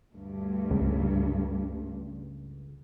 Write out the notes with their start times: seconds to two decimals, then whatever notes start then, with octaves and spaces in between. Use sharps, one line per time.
0.14 D2 G2
0.71 C#2